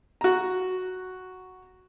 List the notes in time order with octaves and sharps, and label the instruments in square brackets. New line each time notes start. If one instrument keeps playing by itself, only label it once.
[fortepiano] F#4 A#5